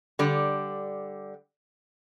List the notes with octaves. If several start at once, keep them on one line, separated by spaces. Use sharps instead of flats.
D3 G3 D5